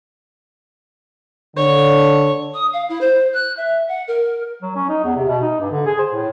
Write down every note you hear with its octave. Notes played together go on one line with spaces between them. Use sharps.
D3 C#5
D#6
F5
E4
C5
F#6
E5
F#5
A#4
F#3
C#4
D#4
E2
C3
B2
D#4
G2
D3
G#4
C5
A2